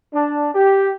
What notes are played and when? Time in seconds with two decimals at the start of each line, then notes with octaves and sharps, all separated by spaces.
0.13 D4
0.55 G4